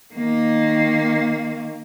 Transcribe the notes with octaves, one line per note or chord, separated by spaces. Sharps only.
D#3 A#3